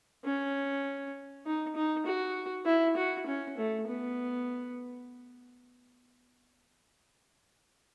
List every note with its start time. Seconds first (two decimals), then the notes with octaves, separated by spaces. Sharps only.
0.24 C#4
1.46 D#4
1.76 D#4
2.06 F#4
2.66 E4
2.96 F#4
3.27 C#4
3.57 A3
3.87 B3